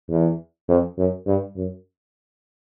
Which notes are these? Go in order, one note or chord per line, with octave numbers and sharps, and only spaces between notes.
E2
F2
F#2
G2
F#2